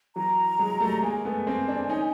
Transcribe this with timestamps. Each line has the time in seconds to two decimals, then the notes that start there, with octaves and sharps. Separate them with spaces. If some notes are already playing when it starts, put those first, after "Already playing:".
0.16 E3 F#3 A#5
0.59 F#3 G#3
0.80 G3 A3
1.02 G#3 A#3 G#5
1.25 A3 B3
1.46 A#3 C4 G#5
1.68 C4 D4
1.90 C#4 D#4